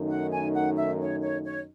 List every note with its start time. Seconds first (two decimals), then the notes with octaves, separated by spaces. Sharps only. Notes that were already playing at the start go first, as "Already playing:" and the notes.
Already playing: F#2 D#3 A3 D#4
0.10 F#5
0.32 G#5
0.54 F#5
0.77 E5
1.00 C#5
1.22 C#5
1.45 C#5